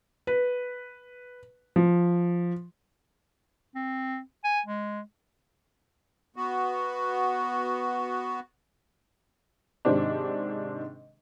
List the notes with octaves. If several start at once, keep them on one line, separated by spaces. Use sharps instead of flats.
B4
F3
C4
G#5
G#3
B3 F#4
G#2 C3 D#3 C4 D4